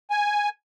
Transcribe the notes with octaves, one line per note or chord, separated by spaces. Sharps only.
G#5